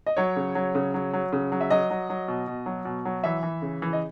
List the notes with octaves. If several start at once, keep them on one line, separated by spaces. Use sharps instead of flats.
D#5
F#3 C#5
C#3
F#3
C#3
F#3
F#3
C#3
F#3
E5
F#3 D#5
F#3
F#3
B2
B2
F#3
B2
F#3
E3 E5
E3
C#3
E3
D#5